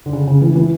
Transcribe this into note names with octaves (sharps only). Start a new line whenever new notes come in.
D3
C#3
C#3
E3
E3